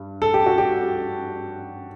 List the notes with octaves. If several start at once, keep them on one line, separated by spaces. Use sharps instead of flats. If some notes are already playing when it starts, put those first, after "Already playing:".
Already playing: G2
A4
G4
F#4
G4